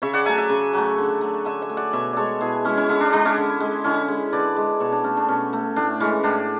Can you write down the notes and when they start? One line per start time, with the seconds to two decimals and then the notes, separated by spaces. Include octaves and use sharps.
0.02 C#3 C#5 E5
0.14 D5 F#5
0.26 F#3 A3 E5 G#5
0.38 E5 G#5
0.50 C#3
0.73 F#3 A3
0.98 D3
1.21 A3
1.45 D3 E5 G#5
1.62 E5 G#5
1.70 A3
1.77 D5 F#5
1.93 B2 C#5 E5
2.13 G#3 A4 C#5 D5
2.41 B2 E4 G#4
2.65 G#3 C#4 E4
2.77 C#4 E4
2.89 D3 C#4 E4
3.01 D4
3.12 G#3 D4
3.25 C#4 E4
3.38 D3
3.60 G#3
3.84 D3 C#4 E4
4.08 G#3
4.33 D3 B4 D5
4.56 G#3
4.80 B2 A4 C#5
4.92 D4
5.04 A3 C#4
5.17 D4
5.28 B2 C#4
5.53 A3
5.76 A2 D4
6.00 E3 G#3 C#4
6.23 A2 D4